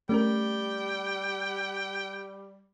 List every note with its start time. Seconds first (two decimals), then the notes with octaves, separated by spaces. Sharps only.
0.09 G3 A3 C#4 A#4 G5